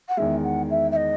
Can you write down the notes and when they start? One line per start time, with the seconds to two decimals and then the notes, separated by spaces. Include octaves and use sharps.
0.08 F#5
0.17 E2 D#3 G#3 E5
0.43 F#5
0.70 E5
0.91 E5
0.96 D#5